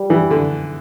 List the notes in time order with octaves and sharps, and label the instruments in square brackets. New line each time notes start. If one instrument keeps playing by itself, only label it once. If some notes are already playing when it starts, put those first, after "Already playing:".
Already playing: [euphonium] G3
[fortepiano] E3
D3